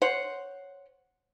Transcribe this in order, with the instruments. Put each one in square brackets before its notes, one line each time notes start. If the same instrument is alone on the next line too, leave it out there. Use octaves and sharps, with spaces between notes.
[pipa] C5 C#5 F#5